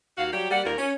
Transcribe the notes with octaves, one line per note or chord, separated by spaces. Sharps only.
D#2 F#4 F5
F#3 G3 G4
G3 A#3 D5 F#5
D#2 G3 F4 A#4
C#4